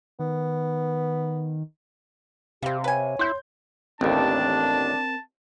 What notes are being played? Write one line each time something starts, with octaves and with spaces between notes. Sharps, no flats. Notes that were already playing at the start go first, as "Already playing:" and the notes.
D#3 B3
C3 G3 C4 G4 F5
B4 C#5 G#5
E4 C6 G6
A1 D#2 C4 D4 A#4 G5 A5